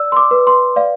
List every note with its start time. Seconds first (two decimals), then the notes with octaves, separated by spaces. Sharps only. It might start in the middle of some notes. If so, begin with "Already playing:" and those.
Already playing: D5 E6
0.12 C6
0.17 D6
0.31 B4
0.47 C6
0.76 D5 F5